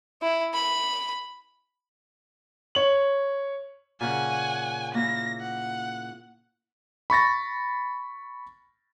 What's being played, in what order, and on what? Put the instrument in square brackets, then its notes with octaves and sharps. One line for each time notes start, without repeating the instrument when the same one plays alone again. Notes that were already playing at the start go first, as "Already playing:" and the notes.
[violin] E4
B5
[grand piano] C#5 F#7
[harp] A#2 C#3 [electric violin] F#5 G#5
[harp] A#3 E4 [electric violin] A#6
[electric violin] F#5
[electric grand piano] B5 C#6 A6 A#6